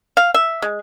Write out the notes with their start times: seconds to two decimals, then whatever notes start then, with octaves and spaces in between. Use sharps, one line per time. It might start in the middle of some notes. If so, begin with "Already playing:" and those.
0.17 F5
0.34 E5
0.62 G#3